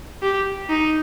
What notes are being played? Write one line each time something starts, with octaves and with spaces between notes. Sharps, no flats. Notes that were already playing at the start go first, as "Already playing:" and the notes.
G4
D#4